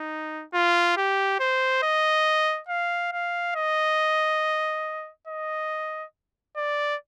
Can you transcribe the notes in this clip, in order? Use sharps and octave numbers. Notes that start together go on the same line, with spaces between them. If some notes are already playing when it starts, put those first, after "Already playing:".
Already playing: D#4
F4
G4
C5
D#5
F5
F5
D#5
D#5
D5